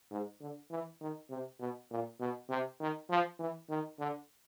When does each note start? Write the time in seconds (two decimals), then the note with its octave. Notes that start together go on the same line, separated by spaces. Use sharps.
0.11 G#2
0.40 D3
0.71 E3
1.01 D#3
1.30 C3
1.60 B2
1.91 A#2
2.20 B2
2.49 C3
2.80 D#3
3.10 F3
3.39 E3
3.70 D#3
3.99 D3